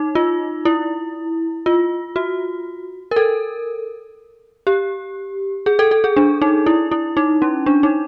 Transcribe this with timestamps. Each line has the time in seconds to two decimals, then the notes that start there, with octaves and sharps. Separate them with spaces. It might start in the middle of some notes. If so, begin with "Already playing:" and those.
Already playing: D#4
0.15 F4
0.65 E4
1.66 F4
2.16 F#4
3.11 A#4
3.16 A4
4.67 G4
5.66 G#4
5.79 A4
5.91 A4
6.04 G#4
6.17 D4
6.42 D#4
6.66 E4
6.92 E4
7.17 D#4
7.42 C#4
7.66 D4
7.83 D#4